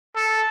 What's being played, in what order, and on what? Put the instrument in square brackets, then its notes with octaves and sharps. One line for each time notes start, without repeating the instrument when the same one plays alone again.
[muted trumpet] A4